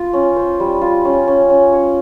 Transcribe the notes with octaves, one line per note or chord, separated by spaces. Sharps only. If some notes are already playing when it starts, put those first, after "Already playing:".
Already playing: F4
C#4
C5
G3
F4
C#4
C#4
C#4
C#5